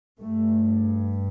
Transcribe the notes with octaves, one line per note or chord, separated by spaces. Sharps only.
G2 A3